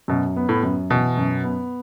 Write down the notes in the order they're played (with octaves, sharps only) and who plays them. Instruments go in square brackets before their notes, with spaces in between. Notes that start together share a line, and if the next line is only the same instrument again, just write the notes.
[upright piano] F#2 [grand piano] B2
[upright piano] B3
[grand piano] A2
[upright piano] F#2
[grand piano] B2 [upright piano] E3
[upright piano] F#2
B3